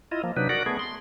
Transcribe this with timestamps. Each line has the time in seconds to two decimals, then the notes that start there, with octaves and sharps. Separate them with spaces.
0.11 E4 F4 D#5
0.24 F3 A#3
0.37 C3 F#3 D4 D#4 B4
0.49 F#4 A#4 D5 F#5
0.66 A3 B3 G#4
0.79 C6